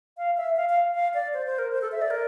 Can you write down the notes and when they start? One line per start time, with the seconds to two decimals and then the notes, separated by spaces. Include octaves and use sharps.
0.18 F5
0.37 E5
0.56 F5
0.69 F5
0.95 F5
1.14 D5
1.34 C5
1.46 C5
1.59 A#4
1.72 C5
1.82 A4
1.92 E5
2.02 D5
2.10 A#4